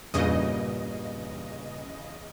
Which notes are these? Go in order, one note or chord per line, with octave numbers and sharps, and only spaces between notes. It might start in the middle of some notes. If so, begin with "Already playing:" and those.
E2 G2 A#2 C#3 D#5